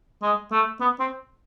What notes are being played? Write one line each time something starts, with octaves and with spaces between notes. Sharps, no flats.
G#3
A3
B3
C4